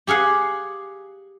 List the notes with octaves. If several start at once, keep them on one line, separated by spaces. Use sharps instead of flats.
G4 G#4 F5 F#5